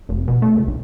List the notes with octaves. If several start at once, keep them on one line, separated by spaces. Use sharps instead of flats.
F1
B2
A3
C#2
B1